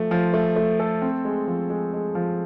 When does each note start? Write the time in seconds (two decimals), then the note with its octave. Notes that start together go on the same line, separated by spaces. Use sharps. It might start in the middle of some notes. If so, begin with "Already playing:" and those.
Already playing: F3 A3
0.11 F3
0.34 A3
0.56 A3
0.80 A4
1.02 C4
1.25 G#3
1.48 F3
1.70 G#3
1.93 G#3
2.15 F3